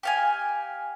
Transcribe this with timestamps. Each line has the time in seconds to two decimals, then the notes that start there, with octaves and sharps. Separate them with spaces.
0.03 G4 F5 G#5